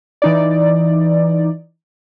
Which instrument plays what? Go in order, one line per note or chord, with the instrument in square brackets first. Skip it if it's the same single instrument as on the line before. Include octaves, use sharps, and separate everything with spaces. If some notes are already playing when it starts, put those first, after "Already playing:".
[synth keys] E3 D#4 D5